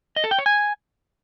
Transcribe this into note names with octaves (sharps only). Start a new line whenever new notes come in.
D#5
A4
G5
C#5
G#5